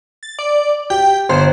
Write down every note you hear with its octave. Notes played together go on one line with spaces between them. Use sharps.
A6
D5
G4 G5
G1 C5